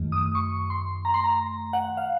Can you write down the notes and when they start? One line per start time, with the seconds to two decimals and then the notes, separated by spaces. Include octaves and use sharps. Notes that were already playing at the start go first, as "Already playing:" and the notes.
Already playing: F#2 D#3 A3
0.12 D#6
0.35 C#6
0.70 C6
1.05 A#5
1.14 C6
1.24 A#5
1.73 F#5
1.97 F5